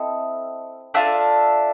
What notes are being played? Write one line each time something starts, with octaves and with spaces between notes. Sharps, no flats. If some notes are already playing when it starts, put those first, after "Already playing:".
Already playing: C4 E4 A4 D#5
D4 F4 A4 E5 F#5